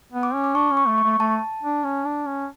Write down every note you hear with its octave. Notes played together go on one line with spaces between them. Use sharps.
B3
D6
C#4
D6
D4 C#6
C#4
C#6
A3
C#6
A3
A3 A5
D4
C#4
D4
C#4